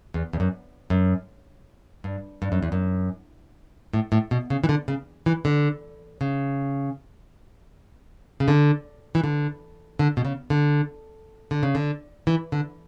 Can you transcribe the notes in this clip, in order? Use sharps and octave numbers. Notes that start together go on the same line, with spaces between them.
E2
E2
F#2
F#2
G2
G2
F#2
E2
F#2
A2
A2
B2
C#3
E3
D3
C#3
E3
D3
C#3
C#3
D3
E3
D3
D3
B2
C#3
D3
D3
C#3
D3
E3
D3